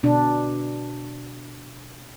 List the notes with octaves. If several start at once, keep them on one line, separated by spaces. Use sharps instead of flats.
B2 D4